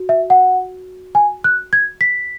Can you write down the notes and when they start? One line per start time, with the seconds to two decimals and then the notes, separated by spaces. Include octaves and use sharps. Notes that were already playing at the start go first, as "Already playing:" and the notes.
Already playing: F#4
0.09 E5
0.30 F#5
1.15 G#5
1.44 F#6
1.73 G#6
2.01 B6